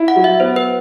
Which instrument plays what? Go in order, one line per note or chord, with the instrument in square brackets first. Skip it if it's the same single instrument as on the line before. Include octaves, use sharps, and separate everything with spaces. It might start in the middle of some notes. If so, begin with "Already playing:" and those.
Already playing: [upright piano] E4
[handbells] F#5
[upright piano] F#3
[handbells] E5
[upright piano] B3 [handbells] C5
[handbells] B4